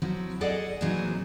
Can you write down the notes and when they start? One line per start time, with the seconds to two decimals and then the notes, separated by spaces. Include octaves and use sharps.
0.02 F3 F#3 C4 E4
0.41 G#4 A4 D5 D#5 F#5
0.81 A#2 E3 F#3 C4 D#4 G#4